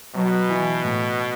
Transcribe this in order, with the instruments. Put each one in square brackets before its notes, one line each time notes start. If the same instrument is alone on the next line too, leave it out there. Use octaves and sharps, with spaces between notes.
[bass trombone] B2 [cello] F#3
[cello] E3
A2